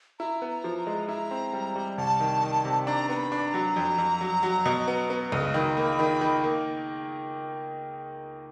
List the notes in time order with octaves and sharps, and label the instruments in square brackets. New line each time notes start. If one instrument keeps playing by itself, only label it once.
[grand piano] E4 [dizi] A#5
[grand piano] B3
[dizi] A#5
[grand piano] F3
[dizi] A#5
[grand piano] G#3
[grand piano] E4 [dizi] A#5
[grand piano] C4
G3
G3
[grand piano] C2 [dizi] A5
[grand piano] D#3
D#3
C3
[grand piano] D4 [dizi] A#5
[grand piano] B3 [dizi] A#5
[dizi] B5
[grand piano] D4
[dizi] A#5
[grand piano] F#3
F2
F2
F#3
F#3
B2
B3
B3
C#2
[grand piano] D#3 [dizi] B5
[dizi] A#5
[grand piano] A#3 [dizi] B5
[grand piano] D#3
D#3
A#3